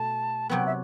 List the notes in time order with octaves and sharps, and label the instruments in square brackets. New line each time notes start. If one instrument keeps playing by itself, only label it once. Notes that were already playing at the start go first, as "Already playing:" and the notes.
Already playing: [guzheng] B2 A3 [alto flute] A5
[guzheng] C3 F#3 B3 [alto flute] G5
[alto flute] E5